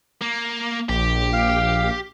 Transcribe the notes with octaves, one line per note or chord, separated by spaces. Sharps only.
A#3
A#1 G4
F5